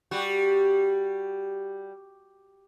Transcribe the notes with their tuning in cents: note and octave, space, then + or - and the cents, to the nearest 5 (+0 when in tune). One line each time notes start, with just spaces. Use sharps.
G3 +0 F#4 +0